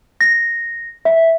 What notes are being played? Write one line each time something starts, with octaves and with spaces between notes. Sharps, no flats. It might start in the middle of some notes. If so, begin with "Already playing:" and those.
A#6
E5